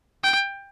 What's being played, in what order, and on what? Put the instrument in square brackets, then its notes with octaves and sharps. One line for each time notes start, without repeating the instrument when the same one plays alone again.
[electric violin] G5